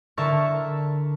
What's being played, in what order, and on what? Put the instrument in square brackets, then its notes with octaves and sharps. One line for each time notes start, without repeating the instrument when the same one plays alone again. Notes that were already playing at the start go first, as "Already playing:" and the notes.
[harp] D3 D4 A#4 E5 A5 C#6